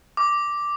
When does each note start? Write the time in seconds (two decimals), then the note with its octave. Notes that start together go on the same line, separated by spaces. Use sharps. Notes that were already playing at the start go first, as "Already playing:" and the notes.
0.17 D6